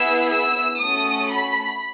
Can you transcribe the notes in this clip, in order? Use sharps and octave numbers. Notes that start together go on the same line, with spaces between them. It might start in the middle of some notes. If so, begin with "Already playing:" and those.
Already playing: B3 E4 G#4 E6
E6
A3 C#4 F#4 A4 D#6
B5